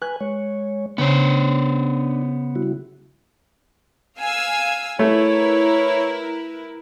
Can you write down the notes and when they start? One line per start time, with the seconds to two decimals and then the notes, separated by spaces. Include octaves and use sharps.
0.02 B4 G#5 F#6
0.20 G#3 C#5
0.98 C#3 B3 D4 C5
2.56 G3 E4 F#4
4.18 F5 G#5 E6
4.99 A3 E4 A#4 B4 C#5